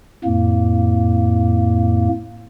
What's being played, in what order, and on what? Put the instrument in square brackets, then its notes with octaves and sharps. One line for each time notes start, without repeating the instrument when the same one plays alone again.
[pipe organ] F2 A2 A#3